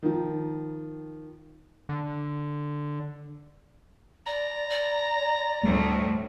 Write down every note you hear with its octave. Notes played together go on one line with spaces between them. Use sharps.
D#3 F3
D3
D5 A#5
D5
D2 A2 G3 A3